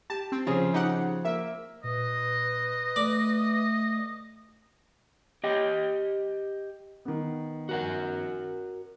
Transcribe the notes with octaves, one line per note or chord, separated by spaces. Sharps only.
G4 A5
C4
C#3 F3 G#4
D#4 G4 F#5
A#3 E5
A#2 B4 D#5
A3 D5
G4 D#5 G5
D#3 B3
F#4 A#4 F#5